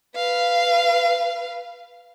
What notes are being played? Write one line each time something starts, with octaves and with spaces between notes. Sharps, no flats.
B4 F5